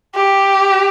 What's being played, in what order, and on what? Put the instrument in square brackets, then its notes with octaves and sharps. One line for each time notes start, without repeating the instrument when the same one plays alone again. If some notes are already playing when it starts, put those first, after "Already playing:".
[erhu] G4